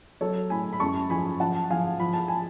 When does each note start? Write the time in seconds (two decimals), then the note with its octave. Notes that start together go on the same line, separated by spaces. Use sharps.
0.21 F#3 A4 C#5
0.50 A2 G#5 B5
0.73 B5
0.80 F#2 A5 C#6
1.10 F3 G#5 B5
1.40 F3 F#5 A5
1.70 F3 F5 G#5
2.00 F3 B5
2.14 A5
2.28 G#5